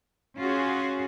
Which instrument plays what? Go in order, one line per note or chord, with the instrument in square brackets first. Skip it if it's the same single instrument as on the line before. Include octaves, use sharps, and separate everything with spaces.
[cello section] C#4 F4 F#4 G#4